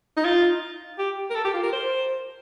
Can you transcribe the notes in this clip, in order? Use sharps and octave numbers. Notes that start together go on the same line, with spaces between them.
D#4
F4
G4
A#4
A4
G4
F4
A#4
C5